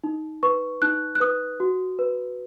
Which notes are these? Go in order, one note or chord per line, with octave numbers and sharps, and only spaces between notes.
D#4
B4 C#6
D#4 F#6
F#6
B4 D#6
F#4
B4